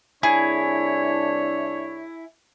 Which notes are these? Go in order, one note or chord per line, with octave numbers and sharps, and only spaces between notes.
C2 D4 E4 G#4 C#5